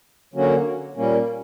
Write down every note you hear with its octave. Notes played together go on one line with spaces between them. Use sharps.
D3 F#3 A#3 C#4 F#4
A#2 G3 A#3 C#4